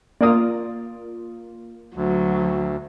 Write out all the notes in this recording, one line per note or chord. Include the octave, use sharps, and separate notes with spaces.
A#3 F4 D5 D#6
D2 F#3